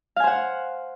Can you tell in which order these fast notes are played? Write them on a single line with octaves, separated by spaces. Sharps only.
F5 G#5 C5 F#5